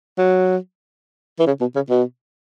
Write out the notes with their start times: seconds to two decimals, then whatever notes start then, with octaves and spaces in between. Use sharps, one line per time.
0.18 F#3
1.39 E3
1.47 C#3
1.61 B2
1.75 C#3
1.89 B2